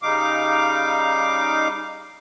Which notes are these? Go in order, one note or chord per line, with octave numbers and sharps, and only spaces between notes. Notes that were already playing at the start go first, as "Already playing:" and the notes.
C#3 G3 D#4 F5 D6